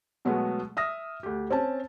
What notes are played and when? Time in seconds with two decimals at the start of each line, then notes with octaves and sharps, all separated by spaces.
0.25 B2 F#3 G#3 A3 B3
0.77 E5 D#6 F6 A#6
1.23 D2 G4
1.50 C4 C#4 A5